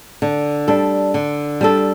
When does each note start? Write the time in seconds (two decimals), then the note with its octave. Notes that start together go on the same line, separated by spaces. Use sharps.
0.22 D3
0.68 G3 D4 A4
1.14 D3
1.61 G3 D4 A4